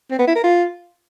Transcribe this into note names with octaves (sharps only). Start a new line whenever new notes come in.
C4
B3
E4
A#4
F4